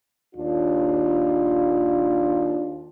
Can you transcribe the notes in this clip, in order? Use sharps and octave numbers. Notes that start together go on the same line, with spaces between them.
D#2 D4 F4